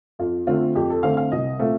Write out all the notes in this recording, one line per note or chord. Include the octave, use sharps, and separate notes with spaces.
F2 F4
D3 A3 C4 F4
F2 G4
A4
D3 A3 C4 F5
F5
C2 D#5
A#2 A3 C4 F5